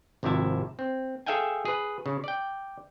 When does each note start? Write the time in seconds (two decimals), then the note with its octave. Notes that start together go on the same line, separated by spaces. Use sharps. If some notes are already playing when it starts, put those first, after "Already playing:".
0.23 G#1 C3 F3 E4 E5 A5
0.79 C4
1.26 G#4 A4 E5 F5 G5 G#5
1.65 G#4 B4
2.06 C#3
2.24 D5 G5